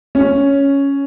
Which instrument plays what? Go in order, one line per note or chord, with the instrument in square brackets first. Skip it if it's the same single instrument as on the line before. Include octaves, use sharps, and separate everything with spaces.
[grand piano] C#4